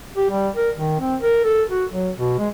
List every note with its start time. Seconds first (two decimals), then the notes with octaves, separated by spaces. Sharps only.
0.17 G4
0.30 G3
0.55 A#4
0.76 D#3
1.00 C4
1.21 A#4
1.44 A4
1.70 F#4
1.92 F#3
2.17 B2
2.39 G#3